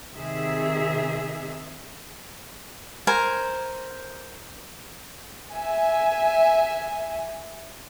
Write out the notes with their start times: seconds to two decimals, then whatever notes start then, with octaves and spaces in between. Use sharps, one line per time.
0.15 C3 D#3 G#4 E5
3.07 A#4 C5 G#5
5.53 E5 G#5